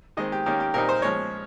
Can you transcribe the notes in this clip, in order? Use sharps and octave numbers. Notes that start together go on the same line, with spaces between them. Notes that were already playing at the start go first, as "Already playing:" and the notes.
D#3 G#3 C4 D#5
G4
D#3 A#3 C#4 G4
G4
A#2 G3 C4 D#4 A#4
C5
F3 G#3 C#4 C#5